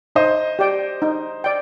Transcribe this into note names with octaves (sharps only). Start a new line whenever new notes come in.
D#4 C5 D#5
G4 D5 G5
D#4
D5 G5